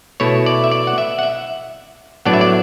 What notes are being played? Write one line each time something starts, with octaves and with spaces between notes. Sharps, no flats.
B2 A3 E4 C#5
D5
E5
D5
F#5
E5
F#5
E5
A2 F#3 B3 D4 D5
E5
D5